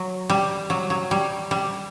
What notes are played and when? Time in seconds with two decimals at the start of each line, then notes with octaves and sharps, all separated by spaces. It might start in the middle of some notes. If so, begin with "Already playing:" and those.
Already playing: F#3
0.30 G3
0.70 F#3
0.90 F#3
1.11 G3
1.51 G3